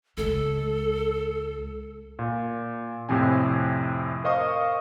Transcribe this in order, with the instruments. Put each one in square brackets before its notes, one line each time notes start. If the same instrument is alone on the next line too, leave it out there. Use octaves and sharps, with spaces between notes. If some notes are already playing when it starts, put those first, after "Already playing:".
[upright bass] C#2 G#3 [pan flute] A4
[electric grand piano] A#2
F2 A2 C3 C4 G#5
A#4 C5 D#5 F5 C#6 D#6